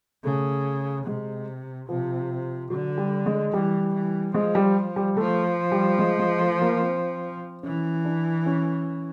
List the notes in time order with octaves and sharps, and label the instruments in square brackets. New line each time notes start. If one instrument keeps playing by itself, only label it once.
[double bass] C#3 [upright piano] A3
[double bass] C3 [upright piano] G#3
[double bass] C3 [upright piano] F3
[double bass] D3 [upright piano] F#3
[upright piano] G3
G#3
[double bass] E3 [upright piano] G3
[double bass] E3
[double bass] F3 [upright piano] G#3
[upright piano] G3
G3
[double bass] F3 [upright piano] A3
[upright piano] G3
G#3
G#3
A3
A#3
C4
[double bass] E3 [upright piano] C#4
[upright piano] D4
C#4